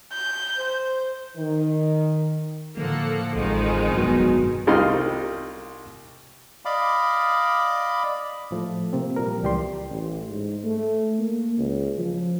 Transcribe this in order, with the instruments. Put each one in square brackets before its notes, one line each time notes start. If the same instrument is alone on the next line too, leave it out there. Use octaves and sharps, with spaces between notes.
[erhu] G6
[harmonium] C5
[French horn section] D#3
[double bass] A2 F3 [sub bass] D3 [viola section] A#3 A4 F#5
[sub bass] A1 [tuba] F2 [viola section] D#3 G#3 D#4
[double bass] F1 G2 [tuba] B2 [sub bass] F#3
[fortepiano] C2 D#4 F4 C6 F6
[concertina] D5 D#5 F5 B5 D6
[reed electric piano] A2 F3 A3
C3 A#3 C4
A#2 F3 G3 A#4
C#2 E3 G3 G4 D5 C6
[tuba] A1
G#2
A3
A#3
C#2
F3